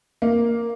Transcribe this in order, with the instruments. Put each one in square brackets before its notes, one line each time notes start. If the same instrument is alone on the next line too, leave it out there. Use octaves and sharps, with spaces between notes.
[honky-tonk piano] A#3